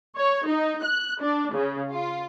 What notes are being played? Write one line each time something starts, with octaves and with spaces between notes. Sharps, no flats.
C#5
D#4
F#6
D4
C#3
F4